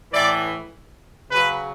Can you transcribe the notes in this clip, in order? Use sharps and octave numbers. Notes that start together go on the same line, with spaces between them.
A2 E3 D5
C#3 F#3 B4